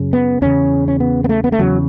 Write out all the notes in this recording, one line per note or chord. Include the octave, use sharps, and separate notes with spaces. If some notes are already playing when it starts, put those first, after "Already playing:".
Already playing: F#2 C#3
B3
E2 C#3 C#4
C#4
B3
B3
A3
B3
A3
E2 C#3 F#3